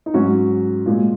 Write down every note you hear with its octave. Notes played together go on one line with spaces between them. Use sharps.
D#4
G#2 F#3 C#4 F#4
A#2 G#3